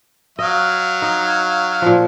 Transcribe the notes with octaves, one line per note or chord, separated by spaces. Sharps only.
F#3 D#5 F5
D#4
A#2 F3